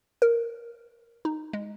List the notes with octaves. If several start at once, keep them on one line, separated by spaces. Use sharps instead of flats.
A#4
D#4
G#3